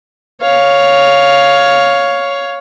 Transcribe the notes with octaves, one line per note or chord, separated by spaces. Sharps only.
C#5 F5